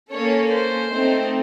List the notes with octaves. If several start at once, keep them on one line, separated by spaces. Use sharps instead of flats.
A#3 C#4 A4 C#5
C5
A3 C4 D#4